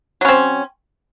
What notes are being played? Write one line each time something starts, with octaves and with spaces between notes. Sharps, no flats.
F#3 C4 C#4